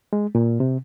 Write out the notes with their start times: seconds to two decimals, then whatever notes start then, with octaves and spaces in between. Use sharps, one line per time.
0.13 G#3
0.35 A#2
0.60 C3